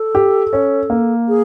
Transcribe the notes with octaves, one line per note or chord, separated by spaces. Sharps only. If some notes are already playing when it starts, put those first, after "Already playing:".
Already playing: A4
G4
C#4
A#3
G#4